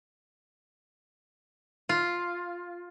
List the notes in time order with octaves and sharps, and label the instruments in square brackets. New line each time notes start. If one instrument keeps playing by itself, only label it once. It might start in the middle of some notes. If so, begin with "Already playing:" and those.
[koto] F4